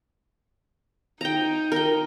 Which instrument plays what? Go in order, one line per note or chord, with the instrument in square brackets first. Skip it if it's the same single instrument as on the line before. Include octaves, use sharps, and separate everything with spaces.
[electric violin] D#4 [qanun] G5 A#5
[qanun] A#4 G5